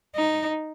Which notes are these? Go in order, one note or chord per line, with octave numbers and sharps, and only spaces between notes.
D#4